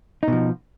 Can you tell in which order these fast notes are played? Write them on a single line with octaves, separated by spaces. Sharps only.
D#4 B2 F3